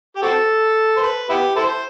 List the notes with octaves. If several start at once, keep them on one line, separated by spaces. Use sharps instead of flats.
G4
C4 F#4 A4
C5
B4
B3 E4 G4
E4 A4 C5